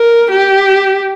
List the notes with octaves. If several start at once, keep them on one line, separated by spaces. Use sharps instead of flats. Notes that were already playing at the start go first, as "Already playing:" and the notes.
Already playing: A#4
G4